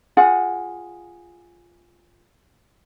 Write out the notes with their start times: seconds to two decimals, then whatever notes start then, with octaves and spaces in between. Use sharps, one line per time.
0.17 F4 G#4 F#5